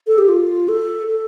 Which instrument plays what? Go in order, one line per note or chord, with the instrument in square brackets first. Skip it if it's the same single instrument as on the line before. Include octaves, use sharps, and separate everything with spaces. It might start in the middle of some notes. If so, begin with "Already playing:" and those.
[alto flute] A4
G4
F4
A4
A4